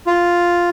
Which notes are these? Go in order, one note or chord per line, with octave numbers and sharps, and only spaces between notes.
F4